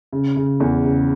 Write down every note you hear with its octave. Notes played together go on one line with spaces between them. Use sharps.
C#3
C#3
E2
C#3